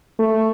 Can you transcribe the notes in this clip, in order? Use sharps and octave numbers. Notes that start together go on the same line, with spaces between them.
A3